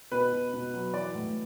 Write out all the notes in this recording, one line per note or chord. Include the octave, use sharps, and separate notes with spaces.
B2 B4
B2
B2
F#3
E3 D5
A2